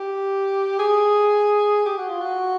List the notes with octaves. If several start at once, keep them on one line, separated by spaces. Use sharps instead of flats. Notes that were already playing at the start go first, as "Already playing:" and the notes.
Already playing: G4
G#4
G4
F#4
F4
F#4